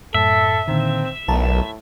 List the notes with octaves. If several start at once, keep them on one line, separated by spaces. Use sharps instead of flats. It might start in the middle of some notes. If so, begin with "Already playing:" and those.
F#2 A2 A4 E5
A#2 D3 D#3 C4
B1 A2 A#4 A5 A#5